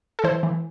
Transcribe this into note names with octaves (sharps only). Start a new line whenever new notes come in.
A4
E3 C5
E3